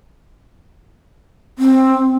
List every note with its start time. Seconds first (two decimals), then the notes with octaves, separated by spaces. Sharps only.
1.59 C4